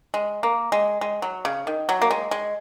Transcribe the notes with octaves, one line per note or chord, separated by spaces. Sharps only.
G#3
A#3
G#3
G#3
F#3
C#3
D#3
F#3
A#3
G#3
G#3